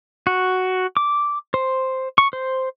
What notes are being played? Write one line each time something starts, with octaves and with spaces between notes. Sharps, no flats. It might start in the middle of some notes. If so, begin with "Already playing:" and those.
F#4
D6
C5
C#6
C5